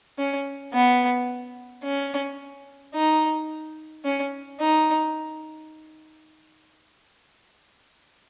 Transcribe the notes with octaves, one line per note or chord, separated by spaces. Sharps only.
C#4
B3
C#4
D#4
C#4
D#4